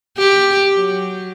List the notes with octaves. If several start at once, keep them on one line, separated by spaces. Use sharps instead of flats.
G4
F#3